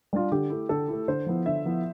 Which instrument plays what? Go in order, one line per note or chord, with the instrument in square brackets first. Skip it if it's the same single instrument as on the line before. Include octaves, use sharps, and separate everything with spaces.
[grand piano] G3 D4 F4
[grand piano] D3 [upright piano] G4
[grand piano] A3 E4
[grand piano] D3 [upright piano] A4
[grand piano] A3 E4
[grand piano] D3 [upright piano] C5
[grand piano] F3 B3 E4
[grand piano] D3 [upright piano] E5
[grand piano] F3 B3 E4